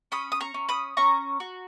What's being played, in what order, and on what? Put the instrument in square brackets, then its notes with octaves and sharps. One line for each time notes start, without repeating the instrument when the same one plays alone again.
[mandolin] C#4 B5 D#6
D#6
A#5 C#6
C#4
B5 D#6
C#4 A#5 C#6
F#4